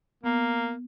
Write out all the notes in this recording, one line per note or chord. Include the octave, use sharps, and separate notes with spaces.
A#3 B3